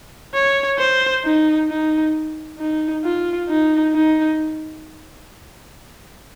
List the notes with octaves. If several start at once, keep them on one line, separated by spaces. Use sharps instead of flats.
C#5
C5
D#4
D#4
D#4
F4
D#4
D#4